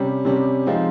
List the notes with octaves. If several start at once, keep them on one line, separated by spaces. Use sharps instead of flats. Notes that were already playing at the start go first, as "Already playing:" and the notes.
Already playing: C3 G3 C#4
C3 G3 C#4
F3 G#3 C4 D#4